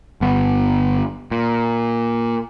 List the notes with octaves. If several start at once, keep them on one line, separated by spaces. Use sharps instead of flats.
G1 B3
A#2